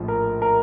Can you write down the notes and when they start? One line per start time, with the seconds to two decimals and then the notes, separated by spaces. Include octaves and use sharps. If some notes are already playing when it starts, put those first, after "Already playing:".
Already playing: A#1 A2 F3
0.08 A#4
0.42 A#4